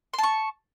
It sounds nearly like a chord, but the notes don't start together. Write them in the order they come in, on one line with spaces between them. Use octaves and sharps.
C6 A5 C#6